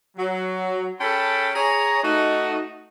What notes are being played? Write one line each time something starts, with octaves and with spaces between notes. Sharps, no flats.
F#3
C#4 G#4 A4 G5 A5 B5
G#4 C#5 A#5
A3 D#4 F#4